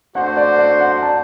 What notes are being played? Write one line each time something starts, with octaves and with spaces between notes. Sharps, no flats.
A3 D4 F#4 C5 F#5
D5
D5
F#5
A5